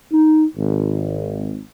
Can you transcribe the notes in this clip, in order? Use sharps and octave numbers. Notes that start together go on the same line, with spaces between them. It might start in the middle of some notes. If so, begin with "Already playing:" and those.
D#4
G#1